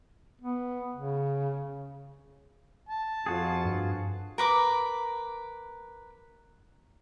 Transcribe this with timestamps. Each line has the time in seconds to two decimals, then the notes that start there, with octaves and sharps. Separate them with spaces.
0.42 B3
0.96 C#3
2.89 A5
3.26 F2 F4 F#4 G#4
3.65 G2
4.38 A#4 B4 D6